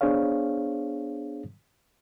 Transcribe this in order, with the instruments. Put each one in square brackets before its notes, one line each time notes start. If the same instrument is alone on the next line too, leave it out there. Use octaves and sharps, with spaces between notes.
[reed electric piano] B3 D4 G#4 C5 C#5 F5